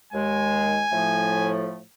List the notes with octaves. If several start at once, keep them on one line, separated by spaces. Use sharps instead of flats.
D#2 G#3 G#5
A2 F3 A3